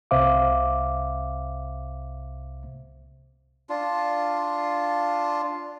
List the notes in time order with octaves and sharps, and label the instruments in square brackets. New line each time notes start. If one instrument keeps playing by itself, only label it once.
[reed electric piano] C2 C3 C5 E5 F5 D6
[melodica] D4 F4